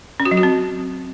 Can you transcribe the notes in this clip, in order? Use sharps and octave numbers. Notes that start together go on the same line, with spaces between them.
C#4
F#4
F#3
F#4
C4